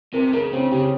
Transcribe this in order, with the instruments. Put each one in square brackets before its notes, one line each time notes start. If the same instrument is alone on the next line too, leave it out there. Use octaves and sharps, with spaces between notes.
[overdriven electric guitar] C3 [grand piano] A#4
[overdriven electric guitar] C#3 [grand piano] A#4
[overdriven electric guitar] C#3 [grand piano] C4
[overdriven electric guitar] C#3 [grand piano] G4